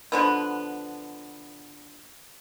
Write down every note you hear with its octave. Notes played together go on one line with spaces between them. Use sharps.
D3 F3 B3